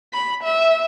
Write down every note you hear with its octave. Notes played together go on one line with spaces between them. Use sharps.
B5
E5